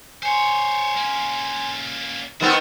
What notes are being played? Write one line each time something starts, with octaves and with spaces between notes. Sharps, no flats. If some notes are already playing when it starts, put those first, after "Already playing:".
C5 C#5 G#5 C6
A#3 C#4
D#3 B3 C4 F#4